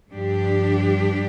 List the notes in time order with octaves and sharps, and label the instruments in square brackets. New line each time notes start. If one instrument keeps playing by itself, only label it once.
[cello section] G2 F3 D4 G4